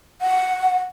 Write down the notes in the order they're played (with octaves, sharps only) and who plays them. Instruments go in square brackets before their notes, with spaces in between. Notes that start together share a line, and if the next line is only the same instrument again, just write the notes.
[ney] F#5